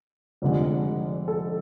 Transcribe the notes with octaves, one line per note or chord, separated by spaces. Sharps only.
F1 F2 D3 G#3
A4